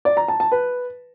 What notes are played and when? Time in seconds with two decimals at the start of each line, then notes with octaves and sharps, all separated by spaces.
0.05 D5
0.17 A#5
0.28 A5
0.40 A5
0.52 B4